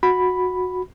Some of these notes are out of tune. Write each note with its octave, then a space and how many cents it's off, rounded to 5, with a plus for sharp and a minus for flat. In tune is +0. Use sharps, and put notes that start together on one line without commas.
F#4 -15 B5 +0